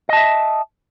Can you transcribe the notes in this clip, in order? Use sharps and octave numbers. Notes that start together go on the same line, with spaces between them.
D#5 E5 A5